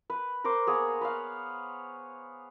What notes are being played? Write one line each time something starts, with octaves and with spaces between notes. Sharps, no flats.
B4
A#4 C5 D6
A#3 B3 G#4 C#5
B4 C#5 F5